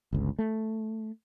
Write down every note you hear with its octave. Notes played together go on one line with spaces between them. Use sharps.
G1 C#2
A3